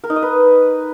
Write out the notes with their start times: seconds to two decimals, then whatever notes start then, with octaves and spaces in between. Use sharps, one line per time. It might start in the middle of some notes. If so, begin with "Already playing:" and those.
0.04 A#4
0.10 D#4
0.16 D#5
0.22 B4